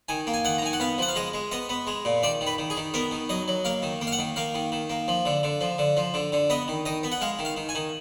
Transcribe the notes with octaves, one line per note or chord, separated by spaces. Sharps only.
D#3 G#5
A#3
G#5
D#3 F#5
A#5
D#3 G#5
F#5
B3 F5
F3 F#5
F5
G#3 D#5
G#3
B3 D#5
B3
G#3
A#2
D#3 D5
D#3
B4
D#3
G#4
D#3
B3 A#4
D#3
F#3 D#5
F#3
A#3 F5
D#3
A#3
F5
F#5
D#3
A#3 F5
D#3
D#3
A#3
F3
D3
D3
F3
D3
F3
D3
D3
B3 D#5
D#3
D#3 D#5
B3
F#5
G#3 F5
D#3
F5
D#3
G#5
D#3